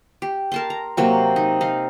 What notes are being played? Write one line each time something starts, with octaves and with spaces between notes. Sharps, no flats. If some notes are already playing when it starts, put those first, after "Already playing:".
G4
A#4 A5 C6
A#5
C3 F#3 A#3
D#4
D#4 F5